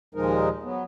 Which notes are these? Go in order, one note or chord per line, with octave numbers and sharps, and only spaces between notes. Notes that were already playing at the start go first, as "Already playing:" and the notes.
D#2 A#2 F3 G#3 D#4 A#4
F#3 B3